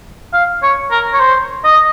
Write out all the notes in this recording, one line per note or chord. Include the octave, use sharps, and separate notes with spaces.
F5
C#5
A#4
C#5
C5
D#5